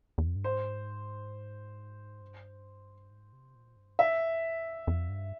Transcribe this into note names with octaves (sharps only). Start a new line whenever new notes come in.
E2
F2
G2
G#2 C5
G2
G#2
C3
A#2
G2
F2 E5
E2
F2
F2
G2